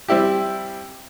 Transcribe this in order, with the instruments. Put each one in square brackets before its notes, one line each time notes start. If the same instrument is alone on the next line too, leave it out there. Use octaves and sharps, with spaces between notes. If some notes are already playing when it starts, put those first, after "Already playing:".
[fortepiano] G3 C4 E4 G4